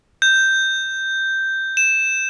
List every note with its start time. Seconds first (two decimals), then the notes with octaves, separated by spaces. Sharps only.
0.22 G6
1.77 E7